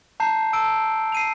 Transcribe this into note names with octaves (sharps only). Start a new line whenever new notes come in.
A5 A#5 G6 C7
A5 E6 D7
C7 D#7 F7